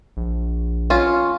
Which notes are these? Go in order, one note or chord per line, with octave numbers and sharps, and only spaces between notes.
A#1
C#4 F4